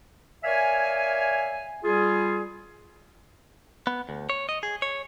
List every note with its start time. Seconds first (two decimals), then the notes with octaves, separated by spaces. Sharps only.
0.44 A#4 C#5 D5 E5 F5 G#5
1.84 G3 F4 G#4
3.87 B3
4.09 D2
4.30 C#5
4.49 D#5
4.63 G#4
4.82 C#5